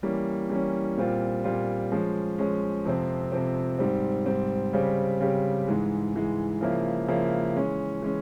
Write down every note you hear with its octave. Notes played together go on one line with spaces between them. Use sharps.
E3 G3 A#3 C#4
E3 G3 A#3 C#4
A#2 G3 C4 F4
A#2 G3 C4 F4
F3 G#3 C#4
F3 G#3 C#4
F2 C3 F3 C4
F2 C3 F3 C4
G#2 G3 C4
G#2 G3 C4
C#3 G3 C4 G4
C#3 G3 C4 G4
G#2 E3 G#3
G#2 E3 G#3
C#3 F3 A#3 E4
C#3 F3 A#3 E4
E3 G#3 C#4
E3 G#3 C#4